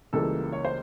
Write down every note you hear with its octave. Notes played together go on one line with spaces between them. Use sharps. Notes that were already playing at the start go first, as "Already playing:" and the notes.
C#2 C#3 E3 G3 A#3 A4
C#5
C5